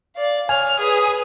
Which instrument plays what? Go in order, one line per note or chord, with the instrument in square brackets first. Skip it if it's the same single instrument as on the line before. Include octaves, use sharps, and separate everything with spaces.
[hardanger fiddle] D5 F5
[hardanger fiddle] C#5 [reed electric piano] G#5 [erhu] F6
[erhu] G#4 [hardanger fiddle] B4